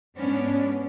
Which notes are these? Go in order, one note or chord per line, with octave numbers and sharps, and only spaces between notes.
G#2 B3 C#4 D4